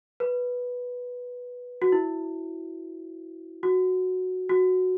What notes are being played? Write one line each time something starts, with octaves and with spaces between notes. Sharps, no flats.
B4
F#4
E4
F#4
F#4